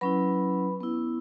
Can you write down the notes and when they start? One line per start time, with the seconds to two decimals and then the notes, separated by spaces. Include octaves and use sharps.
0.01 F#3 C#4 E4 B4 B5
0.81 B3 E4